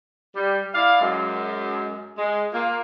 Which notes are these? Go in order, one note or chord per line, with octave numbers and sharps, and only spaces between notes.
G3
E4 D5 F5
F#2 G#3
G#3
A#3 F4